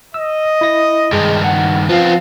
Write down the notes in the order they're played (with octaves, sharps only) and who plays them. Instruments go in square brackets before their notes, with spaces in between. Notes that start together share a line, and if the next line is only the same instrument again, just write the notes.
[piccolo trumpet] D#5 [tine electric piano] E6
[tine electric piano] E4 A#6
[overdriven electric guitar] G2 D#3 [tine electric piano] G#3
[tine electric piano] F#5
[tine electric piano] F3 F5 [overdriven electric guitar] B3 C4